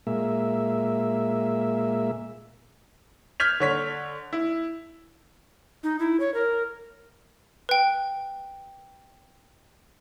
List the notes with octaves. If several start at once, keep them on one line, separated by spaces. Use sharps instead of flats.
A#2 G#3 A#3 E5
F6 G6 G#6 B6 F7
D3 C#5 B6
E4
D#4
E4
C#5
A#4
B4 G5